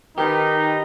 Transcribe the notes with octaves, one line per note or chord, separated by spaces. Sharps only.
D#3 D#4 G4 B4